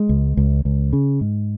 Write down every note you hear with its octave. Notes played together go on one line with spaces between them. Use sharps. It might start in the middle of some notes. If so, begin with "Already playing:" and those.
Already playing: G#3
C#2
C#2
C#2
C#3
G#2